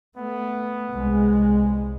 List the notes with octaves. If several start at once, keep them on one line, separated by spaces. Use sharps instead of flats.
A3 B3
C2 G#3